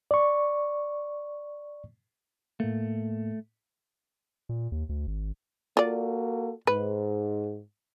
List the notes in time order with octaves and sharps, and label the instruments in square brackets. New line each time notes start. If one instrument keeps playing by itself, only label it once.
[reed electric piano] D5 C#6
[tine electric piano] A2 A#3 [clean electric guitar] A3
[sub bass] A#2
D#2
D2
G#1
[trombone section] A#3 F#4 A4 [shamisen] F4 D5
[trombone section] G#2 [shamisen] B4